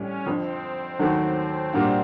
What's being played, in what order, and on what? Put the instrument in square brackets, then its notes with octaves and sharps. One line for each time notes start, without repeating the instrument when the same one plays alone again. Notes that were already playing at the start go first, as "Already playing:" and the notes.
Already playing: [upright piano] A2 E3 G3 [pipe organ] C#4
[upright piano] F2 D3 F3 [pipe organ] C4
[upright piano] D#2 D#3 F#3 A3
A#2 G3 A#3 D4 F#4